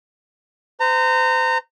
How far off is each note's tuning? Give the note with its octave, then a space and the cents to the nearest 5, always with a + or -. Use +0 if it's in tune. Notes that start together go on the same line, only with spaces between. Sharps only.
C5 -40 A#5 -25